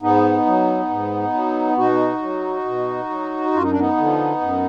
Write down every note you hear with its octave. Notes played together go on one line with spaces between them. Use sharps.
G#2 B3 D#4
F#3
G#2
F#3
B2 D#4 F#4
F#3
B2
F#3
F#2 F4
D#4
D4
B3 D#4
D3 F3
F#2